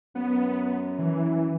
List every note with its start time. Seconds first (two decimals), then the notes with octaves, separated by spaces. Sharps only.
0.15 F#2 B3
0.99 E3